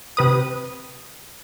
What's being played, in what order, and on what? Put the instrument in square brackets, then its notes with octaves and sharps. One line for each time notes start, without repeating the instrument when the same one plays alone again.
[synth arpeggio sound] C3 B4 D#6